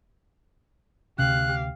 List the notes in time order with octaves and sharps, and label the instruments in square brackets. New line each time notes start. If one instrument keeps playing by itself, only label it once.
[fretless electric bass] D2 C3 C#4 [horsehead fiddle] G4 F5 [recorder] F#6